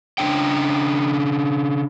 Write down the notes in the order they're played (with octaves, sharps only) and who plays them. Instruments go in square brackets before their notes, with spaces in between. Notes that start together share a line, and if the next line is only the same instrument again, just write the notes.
[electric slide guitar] C#3 D4 C#5 G5